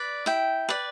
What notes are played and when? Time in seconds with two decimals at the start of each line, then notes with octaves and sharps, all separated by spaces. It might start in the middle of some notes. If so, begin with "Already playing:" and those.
Already playing: B4 D5
0.26 E4 G5
0.69 B4 D5